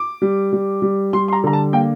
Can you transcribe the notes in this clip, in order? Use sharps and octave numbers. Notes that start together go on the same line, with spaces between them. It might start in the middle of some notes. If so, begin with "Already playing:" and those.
Already playing: D6
G3
G3
G3
G3 C6
C6
A#5
D3 A#5
A5
A#3 G5